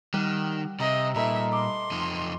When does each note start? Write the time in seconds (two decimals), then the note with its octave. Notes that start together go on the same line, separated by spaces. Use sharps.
0.14 D#3 G3 F#5
0.80 C3 D#5 E5 A#5
1.16 A#2 A3 D#4 B4 E5
1.52 C6 D6
1.91 F2 D#4